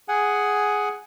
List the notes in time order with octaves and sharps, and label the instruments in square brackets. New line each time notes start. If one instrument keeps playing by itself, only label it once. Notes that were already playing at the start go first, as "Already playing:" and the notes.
[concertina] G#4 F#5 G#5